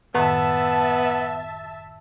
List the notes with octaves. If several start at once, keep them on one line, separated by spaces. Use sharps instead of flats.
F#2 A2 D#3 B3 E5 A5